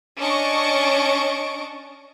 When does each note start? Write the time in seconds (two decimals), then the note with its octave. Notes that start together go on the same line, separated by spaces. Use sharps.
0.19 C#4 D4 D#5 A5 C#6 D7